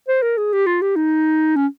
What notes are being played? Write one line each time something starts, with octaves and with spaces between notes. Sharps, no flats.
C5
A#4
G#4
G4
F4
G4
D#4
C#4